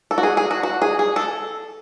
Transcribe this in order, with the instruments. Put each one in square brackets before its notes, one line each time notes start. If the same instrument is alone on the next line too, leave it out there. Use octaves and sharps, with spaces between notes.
[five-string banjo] A4
F#4
G#4
G#4
F#4
F#4
G#4
G#4
A4